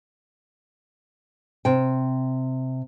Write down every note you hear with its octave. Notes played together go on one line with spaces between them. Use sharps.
C3 G5